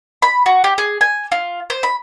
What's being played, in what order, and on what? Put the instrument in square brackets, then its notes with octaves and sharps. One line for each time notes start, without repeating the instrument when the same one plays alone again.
[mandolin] B5
F#4
G4
G#4
G#5
F4
C5
B5